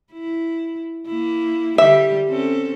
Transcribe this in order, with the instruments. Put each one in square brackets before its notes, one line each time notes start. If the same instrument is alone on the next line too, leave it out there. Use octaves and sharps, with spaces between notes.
[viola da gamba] E4
A#3 E4
[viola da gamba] D3 G3 G4 [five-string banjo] E5
[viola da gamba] C4 C#4 A4